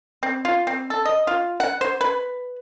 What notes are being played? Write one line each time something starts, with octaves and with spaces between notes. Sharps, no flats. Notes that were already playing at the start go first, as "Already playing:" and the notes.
C4
F4
C4
A4
D#5
F4
F#5
C5
B4